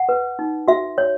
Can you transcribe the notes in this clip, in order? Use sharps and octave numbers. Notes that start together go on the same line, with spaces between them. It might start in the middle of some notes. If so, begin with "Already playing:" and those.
Already playing: F#5
B4
D#4
F#4 E5
C#5